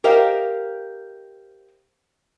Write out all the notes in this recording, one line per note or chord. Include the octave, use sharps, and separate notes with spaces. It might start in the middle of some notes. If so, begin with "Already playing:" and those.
G4 A#4 C5 D#5 F5 G5